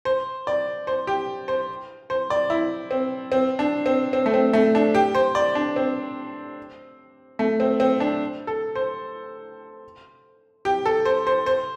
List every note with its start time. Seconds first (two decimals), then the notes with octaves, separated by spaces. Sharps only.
0.05 C5
0.47 D5
0.87 C5
1.07 G4
1.48 C5
2.10 C5
2.30 D5
2.50 E4
2.91 C4
3.32 C4
3.59 D4
3.86 C4
4.13 C4
4.26 A3
4.34 C4
4.53 A3
4.75 D4
4.95 G4
5.15 C5
5.35 D5
5.55 D4
5.76 C4
7.39 A3
7.60 C4
7.80 C4
8.00 D4
8.47 A4
8.75 C5
10.65 G4
10.86 A4
11.05 C5
11.27 C5
11.46 C5